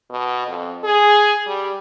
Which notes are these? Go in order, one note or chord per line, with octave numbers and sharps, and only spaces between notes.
B2
F2
G#4
G3